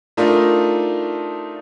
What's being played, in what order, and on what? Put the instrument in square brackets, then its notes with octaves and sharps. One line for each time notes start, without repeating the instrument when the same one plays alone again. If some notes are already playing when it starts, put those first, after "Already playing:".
[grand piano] A3 D4 D#4 F4 A#4